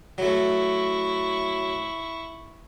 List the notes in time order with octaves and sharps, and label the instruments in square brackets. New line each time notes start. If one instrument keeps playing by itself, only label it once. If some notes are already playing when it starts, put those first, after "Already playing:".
[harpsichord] F#3 A3 [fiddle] E4 C#6